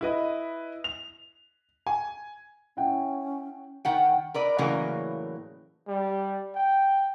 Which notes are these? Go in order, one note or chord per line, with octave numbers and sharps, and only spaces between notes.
E4 B4 D#5
F7
G#5
C#4 E4 F#5 G5
D#3 F#5 G5
A#4 B4 D5
A2 C#3 E3 F#3 A#3
G3
G5